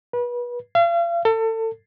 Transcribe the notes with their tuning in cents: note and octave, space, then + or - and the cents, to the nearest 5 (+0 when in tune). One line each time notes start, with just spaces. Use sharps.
B4 -30
F5 -40
A4 +30